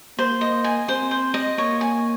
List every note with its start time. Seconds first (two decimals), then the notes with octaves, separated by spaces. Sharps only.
0.19 A#3 C5
0.41 D#5
0.64 G#5
0.88 C4 C5
1.11 C5
1.34 D#5
1.58 A#3 C#5
1.81 G#5